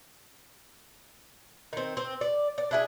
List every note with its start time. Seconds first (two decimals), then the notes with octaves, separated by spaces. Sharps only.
1.73 D#3 C4
1.97 C4
2.21 D5
2.58 D5
2.71 D4 E4 G#4